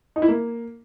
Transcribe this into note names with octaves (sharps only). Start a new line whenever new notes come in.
D#4
E4
A#3